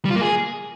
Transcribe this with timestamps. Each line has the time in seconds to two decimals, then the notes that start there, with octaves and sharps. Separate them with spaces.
0.05 G3
0.10 F4
0.16 A#3
0.21 G#4